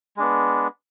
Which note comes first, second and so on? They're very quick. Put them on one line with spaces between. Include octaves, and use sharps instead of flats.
G#3 D4 B3